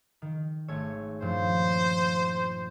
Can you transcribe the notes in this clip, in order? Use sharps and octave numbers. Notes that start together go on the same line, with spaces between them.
D#3
G#1 A3 C#5
G2 A#2 F3 C5